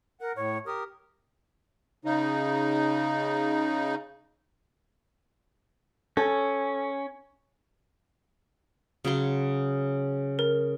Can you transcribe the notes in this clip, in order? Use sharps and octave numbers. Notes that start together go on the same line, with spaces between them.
A#4 F#5
A2 C#5
G4 A#4 D#6
C#3 D#4
C#4 A4
C#3 F#3 C6
A#4